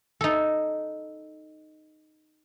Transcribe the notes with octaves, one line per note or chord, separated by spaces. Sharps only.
D#4 A4